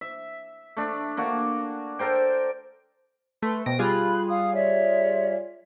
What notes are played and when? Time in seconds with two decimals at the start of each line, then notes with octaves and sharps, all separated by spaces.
0.01 E5
0.77 A3 D4
1.17 A#3 D4 F#4
1.99 A4 A#4 C5 G5
3.42 A3 B4 C6
3.66 B2 C5 G5 A#6 D7
3.79 G3 F4 G#4 B5 F#6
4.29 F5 D#6
4.54 C#5 D5 E5